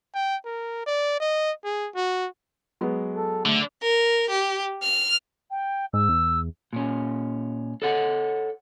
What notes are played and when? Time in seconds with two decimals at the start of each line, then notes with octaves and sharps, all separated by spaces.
0.14 G5
0.45 A#4
0.86 D5
1.20 D#5
1.65 G#4
1.95 F#4
2.81 F#3 G#3 B3
3.12 A4
3.45 D3 A3
3.82 A#4
4.30 G4
4.82 F6
5.51 G5
5.93 G#2 E6
6.09 E2
6.73 A#2 C#4
7.82 A4 C#5 F#5